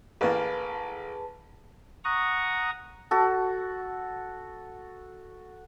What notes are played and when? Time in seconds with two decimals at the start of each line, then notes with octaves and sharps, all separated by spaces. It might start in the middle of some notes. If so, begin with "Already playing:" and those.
0.21 A1 A#3 G#4 B4 A5
2.04 F#5 A#5 C#6 D#6
3.11 F#4 A4